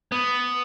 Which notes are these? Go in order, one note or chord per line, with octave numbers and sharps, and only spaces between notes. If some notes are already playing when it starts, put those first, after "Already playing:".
B3